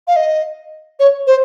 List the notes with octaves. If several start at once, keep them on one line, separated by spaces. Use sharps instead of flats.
F5
D#5
C#5
C5